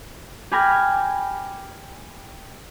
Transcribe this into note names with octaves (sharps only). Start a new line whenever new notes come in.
G4 G#5 B5 F6 G#6 A#6